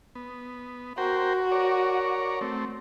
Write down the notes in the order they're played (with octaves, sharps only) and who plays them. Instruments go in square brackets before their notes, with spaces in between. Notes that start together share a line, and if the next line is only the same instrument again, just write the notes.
[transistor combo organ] B3
[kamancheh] F#4 [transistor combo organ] A#4 C5 G5
[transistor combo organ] A#4 C#5 D5
A3 C4